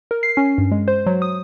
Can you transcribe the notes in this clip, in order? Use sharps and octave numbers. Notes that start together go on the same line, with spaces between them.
A#4
C7
C#4
G2
G#3
C5
F#3
D#6